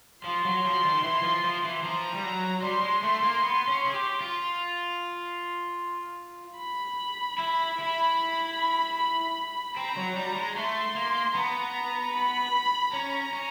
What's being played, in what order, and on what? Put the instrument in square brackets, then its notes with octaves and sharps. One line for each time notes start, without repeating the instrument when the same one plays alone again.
[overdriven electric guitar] F3 [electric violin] C6
[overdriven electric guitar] F#3
F3
D#3
E3
F3
F3
E3
[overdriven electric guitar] F3 [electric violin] A#5
[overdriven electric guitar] G3
F#3
[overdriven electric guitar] G3 [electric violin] C6
[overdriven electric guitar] G#3
A3
A#3
B3
C#4
G#4
G4
F4
[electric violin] B5
[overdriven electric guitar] E4
E4
[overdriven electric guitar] C4 [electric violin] A#5
[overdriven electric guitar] F#3
G3
G#3
[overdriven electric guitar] A3 [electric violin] C6
[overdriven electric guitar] A#3
[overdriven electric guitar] B3 [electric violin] A#5
[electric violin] B5
[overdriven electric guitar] C#4 [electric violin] A#5
[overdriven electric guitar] C#4